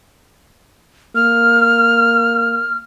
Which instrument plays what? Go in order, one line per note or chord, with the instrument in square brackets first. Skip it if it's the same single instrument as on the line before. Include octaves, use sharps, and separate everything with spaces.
[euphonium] A#3 [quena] F6